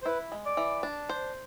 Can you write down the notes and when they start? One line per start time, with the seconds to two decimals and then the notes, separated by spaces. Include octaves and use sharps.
0.02 C5
0.06 E4 B4
0.32 G#3
0.45 D5
0.57 E3
0.83 D4
1.09 C5